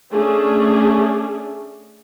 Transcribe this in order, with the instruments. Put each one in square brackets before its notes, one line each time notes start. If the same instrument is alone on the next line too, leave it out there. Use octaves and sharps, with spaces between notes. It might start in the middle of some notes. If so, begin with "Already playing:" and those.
[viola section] A3 C#4 D4 G#4